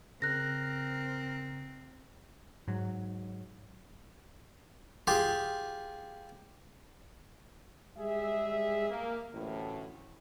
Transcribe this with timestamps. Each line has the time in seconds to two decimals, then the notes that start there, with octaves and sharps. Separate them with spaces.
0.22 C#3 C4 A#4 F#6 A#6
2.68 G#2 F#3
5.07 F4 G4 G#4
7.97 G3 G#3 G#4 E5
8.90 A#3
9.33 A1 D2 A2